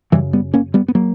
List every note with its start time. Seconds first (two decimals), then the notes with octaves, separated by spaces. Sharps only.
0.12 F#2 C#3 E3 G3
0.33 G3 B3
0.54 A#3 C#4
0.74 G3 B3
0.88 B3
0.95 F#3 A#3